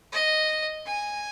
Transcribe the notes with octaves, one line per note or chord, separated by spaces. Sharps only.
D#5
G#5